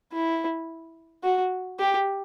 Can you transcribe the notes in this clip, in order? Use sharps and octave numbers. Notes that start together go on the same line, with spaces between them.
E4
F#4
G4